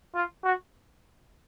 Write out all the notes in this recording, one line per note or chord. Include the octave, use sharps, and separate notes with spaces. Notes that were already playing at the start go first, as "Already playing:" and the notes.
F4
F#4